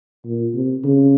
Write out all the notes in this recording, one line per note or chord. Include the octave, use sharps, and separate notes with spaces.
A#2
C3
C#3